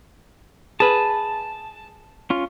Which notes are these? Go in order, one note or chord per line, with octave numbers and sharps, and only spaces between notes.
G#4 B4 A5
C#4 F4